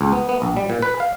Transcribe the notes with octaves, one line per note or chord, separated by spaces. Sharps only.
C#2
B3
B3
A#1
G3
A#2
B4
F5